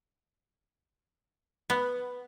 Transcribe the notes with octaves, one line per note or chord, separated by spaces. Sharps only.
B3